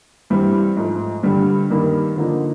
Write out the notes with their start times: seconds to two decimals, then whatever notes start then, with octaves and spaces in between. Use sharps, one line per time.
0.30 G2 E3 G3 C4
0.76 G#2 F3 A3
1.23 G2 D3 G3
1.70 G2 D#3 G3 A#3 D#4
2.16 D3 F3 A#3 D#4